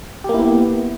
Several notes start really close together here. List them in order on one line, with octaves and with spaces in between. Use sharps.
G4 A#3 E4 B3